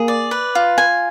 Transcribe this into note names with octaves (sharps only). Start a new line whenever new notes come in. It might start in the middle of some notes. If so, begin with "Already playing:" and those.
Already playing: A#3 G#4
D5
B4
F4
G#5